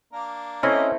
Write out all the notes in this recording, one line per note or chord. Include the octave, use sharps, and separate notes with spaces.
A#3 D4 A#4
A3 C4 C#4 E4 D#5